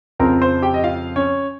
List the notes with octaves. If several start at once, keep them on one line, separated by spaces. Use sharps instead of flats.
F2 C#3 F3 C4 A#4 A#5
C5 C6
G4 G5
D#5
F4 F5
C#4 C#5